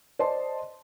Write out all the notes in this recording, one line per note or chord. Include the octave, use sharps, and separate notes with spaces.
C5 D5 D#5 A5 C6